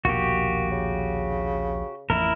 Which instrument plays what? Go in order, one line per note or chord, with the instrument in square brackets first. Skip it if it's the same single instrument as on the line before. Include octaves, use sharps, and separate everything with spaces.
[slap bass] A#1 D#2 B2 [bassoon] A#3 [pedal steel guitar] F#4 G4
[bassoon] C#3
[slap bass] A1 F2 [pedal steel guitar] E4 A#4